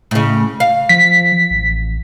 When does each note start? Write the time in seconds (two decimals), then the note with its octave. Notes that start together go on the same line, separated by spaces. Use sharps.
0.11 A2 C#3
0.60 F5
0.89 F3 B6
1.50 A1